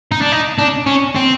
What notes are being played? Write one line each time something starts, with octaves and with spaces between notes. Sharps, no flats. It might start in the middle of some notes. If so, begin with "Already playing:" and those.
D#4
D4
D#4
D4
C#4
C4